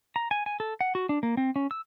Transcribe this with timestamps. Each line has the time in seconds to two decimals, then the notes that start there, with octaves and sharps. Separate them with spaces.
0.16 A#5
0.31 G#5
0.46 G#5
0.60 A4
0.81 F#5
0.95 F#4
1.09 D4
1.23 A#3
1.37 C4
1.56 C#4
1.71 E6